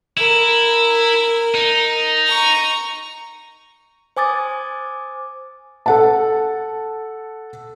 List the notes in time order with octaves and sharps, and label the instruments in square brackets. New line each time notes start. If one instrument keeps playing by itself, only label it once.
[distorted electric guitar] E4 [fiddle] A#4
[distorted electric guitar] D#4
[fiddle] A#5 C#6
[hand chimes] C5 G#5 D6 D#6 A6
[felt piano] A4 F#5 A5